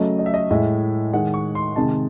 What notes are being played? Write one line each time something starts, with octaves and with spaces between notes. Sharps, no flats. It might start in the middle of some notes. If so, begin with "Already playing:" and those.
Already playing: C#3 F#3 A3 D#5
D#5
E5
D#5
A2 G#3 E5
D#3 G#3 F#5
C#6
C6
C3 D#3 G#3 A5